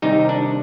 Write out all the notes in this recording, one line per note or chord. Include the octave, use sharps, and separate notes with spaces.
C3 D#3 G3 D#4
D4